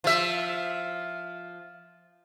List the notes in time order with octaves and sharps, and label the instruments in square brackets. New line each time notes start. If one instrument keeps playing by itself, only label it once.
[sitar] F3 E5